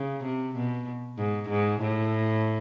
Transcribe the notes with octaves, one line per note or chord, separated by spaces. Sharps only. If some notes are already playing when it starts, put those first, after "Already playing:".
Already playing: C#3
C3
B2
G#2
G#2
A2